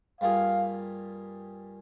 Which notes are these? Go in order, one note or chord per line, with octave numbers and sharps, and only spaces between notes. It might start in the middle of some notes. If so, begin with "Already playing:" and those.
G2 G3 A#3 F4 G#4 F5